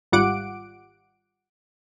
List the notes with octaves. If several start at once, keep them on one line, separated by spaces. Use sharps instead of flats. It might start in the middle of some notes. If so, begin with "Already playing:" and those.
G#1 G3 F4 F#5 D6 D7